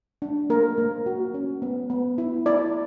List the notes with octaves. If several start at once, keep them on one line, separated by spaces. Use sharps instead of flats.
D4
A#3 A#4
A#3
F#4
C#4
B3
B3
E4
E4 D5